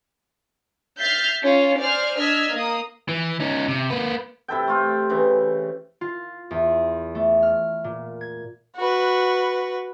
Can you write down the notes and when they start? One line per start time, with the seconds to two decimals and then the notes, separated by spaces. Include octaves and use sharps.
1.00 E5 F6 G6 A6 C7
1.43 C#4 F4
1.78 C5 D5 G#5 F6
2.18 D4 D#5 E6 F6 G#6 B6
2.52 A#3 D#6
3.09 E3
3.40 C#4 D#4
3.68 C3
3.91 A#3 B4
4.48 C3 E4 A4 G5
4.68 A3 F4
5.10 C#3 E3
6.01 F4
6.51 E2
7.15 A3
7.43 F6
7.84 A#2
8.21 G#6
8.76 F#4 B4